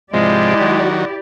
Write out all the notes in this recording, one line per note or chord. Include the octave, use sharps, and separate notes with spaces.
G#2 C3 F3 G#3 E4 G4 D5
D#3 F#3